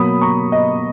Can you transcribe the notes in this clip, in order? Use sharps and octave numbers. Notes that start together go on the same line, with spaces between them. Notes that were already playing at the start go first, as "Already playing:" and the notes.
Already playing: B2 F#3 A#3 B5 D#6
A#5 C#6
D#5